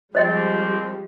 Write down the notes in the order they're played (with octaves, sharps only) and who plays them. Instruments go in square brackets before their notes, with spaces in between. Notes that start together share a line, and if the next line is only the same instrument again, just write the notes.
[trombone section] D#2 C4 [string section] F3 G3 G#3 [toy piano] C5 D#5 G5